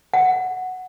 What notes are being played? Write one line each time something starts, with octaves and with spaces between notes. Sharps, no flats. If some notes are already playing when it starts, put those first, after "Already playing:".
F#5